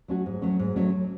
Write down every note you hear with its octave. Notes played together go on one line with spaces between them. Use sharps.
F#3 A3 C#4 F#4
G#2
F#3 A3 C#4
G#2
F#3 A3 C#4